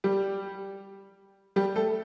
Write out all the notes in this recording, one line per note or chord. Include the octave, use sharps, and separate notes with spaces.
G3 G4
G3 G4
A3 A4